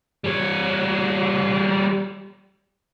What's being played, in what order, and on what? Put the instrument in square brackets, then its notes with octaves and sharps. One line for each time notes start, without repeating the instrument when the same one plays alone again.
[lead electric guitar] G3 C#5